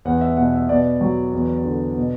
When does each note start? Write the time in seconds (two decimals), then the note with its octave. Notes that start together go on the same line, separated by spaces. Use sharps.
0.05 E2 F#5
0.21 E5
0.37 B2 F#5
0.54 E5
0.69 B2 D5
1.01 F#3
1.34 E2
1.64 D3
1.97 B2